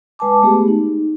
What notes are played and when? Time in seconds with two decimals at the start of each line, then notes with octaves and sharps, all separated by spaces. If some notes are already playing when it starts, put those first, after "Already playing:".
0.19 G#3 B4 G#5 A5 D6
0.42 G#3 A3 B3 G4 G#4
0.68 D#4